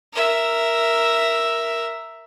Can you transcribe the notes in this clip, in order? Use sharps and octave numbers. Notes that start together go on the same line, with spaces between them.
A#4 E5